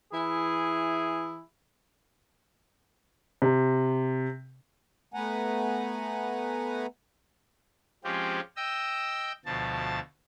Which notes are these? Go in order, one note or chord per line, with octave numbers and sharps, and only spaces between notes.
E3 E4 G#4
C3
A3 B3 B4 F#5 G#5 A#5
F3 G#3 C4 C#4 F4 G4
D#5 G5 E6
D2 B2 F3 A5